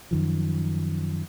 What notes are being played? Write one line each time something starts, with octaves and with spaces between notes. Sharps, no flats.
F#2 D#3 F3